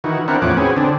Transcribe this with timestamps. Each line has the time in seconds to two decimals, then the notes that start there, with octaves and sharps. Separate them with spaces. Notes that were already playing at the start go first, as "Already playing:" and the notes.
0.04 D#3 E3 F#4
0.28 C4 D4 E4 A#4 F#5
0.42 E2 A2 F3 C#4 F#5 D6
0.57 C4 C#4 F#4 G#4 B4
0.77 D3 C4 D4